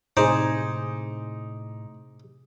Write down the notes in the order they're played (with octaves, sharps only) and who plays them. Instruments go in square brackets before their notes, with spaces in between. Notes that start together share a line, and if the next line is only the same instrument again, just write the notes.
[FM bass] A2 [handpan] C3 G#4 [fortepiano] D#4 [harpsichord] C5 D5